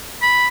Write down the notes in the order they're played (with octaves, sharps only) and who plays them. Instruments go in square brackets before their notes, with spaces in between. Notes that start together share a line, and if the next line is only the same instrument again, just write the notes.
[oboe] B5